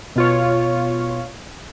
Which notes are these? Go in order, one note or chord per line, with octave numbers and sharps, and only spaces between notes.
B2 F4 C#5